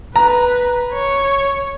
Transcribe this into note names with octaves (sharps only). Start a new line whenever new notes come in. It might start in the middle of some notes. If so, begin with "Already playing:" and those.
B4 A#5
C#5